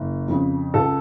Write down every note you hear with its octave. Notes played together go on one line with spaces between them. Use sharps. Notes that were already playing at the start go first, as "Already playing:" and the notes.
Already playing: F#1
F2 C#3
C#2 A4